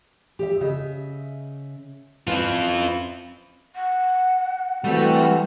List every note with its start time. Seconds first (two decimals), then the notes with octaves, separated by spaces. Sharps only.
0.39 G4 D#5 E5
0.61 C#3 D#5 E5
2.27 C4 C#4 E4 F4 B4
3.75 F#5
4.84 E3 G3 A3 C4 F#4